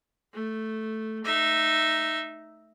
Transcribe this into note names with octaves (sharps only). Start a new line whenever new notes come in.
A3
D#4 E5